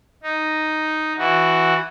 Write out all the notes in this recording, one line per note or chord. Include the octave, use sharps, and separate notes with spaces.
D#4
E3 F#4